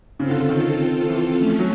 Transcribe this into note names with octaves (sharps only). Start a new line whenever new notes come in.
C#3 C4 F4 A4
D3
D3
D#3
E3
F3 A3 C#4
F#3